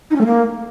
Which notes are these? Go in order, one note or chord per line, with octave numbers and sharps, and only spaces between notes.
D#4
C#4
A3
A#3